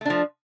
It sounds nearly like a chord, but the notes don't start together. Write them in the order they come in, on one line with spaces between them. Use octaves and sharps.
A3 D4 F3